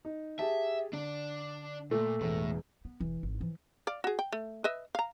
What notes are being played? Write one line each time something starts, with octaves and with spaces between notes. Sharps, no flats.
D#4
G4 G#4 E5 A5
D3 D4 D5
A#2 A3
E1 E2 A2
B3
E1 E3
G#1
E3 F3
D5 F5
F#4 G#4
G5
A3
B4 D#5 E5
F5 A#5